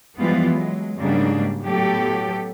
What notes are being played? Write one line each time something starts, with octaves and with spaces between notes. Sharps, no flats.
E3 F3 G3 G#3 B3 F4
F#3 G#3
G#2 C#3 F#3 G3 A#3 D4
A2 F#3 B3 G4 A4